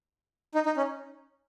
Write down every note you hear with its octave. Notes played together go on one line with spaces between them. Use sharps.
D#4
D#4
C#4